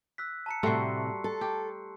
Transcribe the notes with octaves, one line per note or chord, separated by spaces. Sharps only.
E6 F#6 B6
A5 A#5 C#7
A2 C3 G3 A3 F#4 C6 C#6 C7
A4
G4